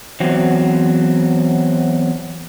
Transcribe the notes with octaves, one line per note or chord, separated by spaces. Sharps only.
E2 F#3 C4